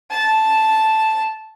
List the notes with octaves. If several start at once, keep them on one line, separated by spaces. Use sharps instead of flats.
A5